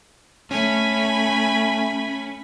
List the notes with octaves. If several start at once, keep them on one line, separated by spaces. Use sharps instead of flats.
A3 C#4 G#5 B5